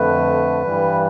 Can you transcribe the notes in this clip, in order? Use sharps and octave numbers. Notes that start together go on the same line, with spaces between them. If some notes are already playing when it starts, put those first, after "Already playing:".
Already playing: F2 D3 A3 B4
G2 E3 G3